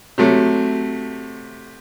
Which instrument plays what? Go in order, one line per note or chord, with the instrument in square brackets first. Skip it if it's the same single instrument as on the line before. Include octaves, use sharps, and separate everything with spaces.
[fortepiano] C3 F#3 A3